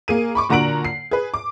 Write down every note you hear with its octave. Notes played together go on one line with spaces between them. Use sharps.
A#3 G#4 D#7
B5 C#6 D6
A#2 D3 F#4 A#5 D7 F#7
C7
G#4 B4
D6